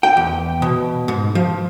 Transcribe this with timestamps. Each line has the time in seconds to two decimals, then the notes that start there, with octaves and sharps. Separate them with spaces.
0.03 G5
0.17 E2
0.62 B2
1.08 G#2
1.35 F3